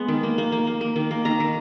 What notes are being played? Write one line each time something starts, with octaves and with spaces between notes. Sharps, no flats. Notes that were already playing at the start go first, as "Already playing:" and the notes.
Already playing: G#3 B3
D#3
A#3
A#3
A#3
A#3
A#3
D#3
A#3
D#3 A#5
D#3